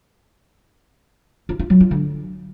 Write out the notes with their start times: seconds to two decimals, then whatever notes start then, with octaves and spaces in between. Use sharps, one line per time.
1.49 F4
1.59 F4
1.70 F#3
1.80 F4
1.91 D3